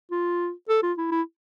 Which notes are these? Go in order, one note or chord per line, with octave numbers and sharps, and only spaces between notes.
F4
A4
F4
E4
E4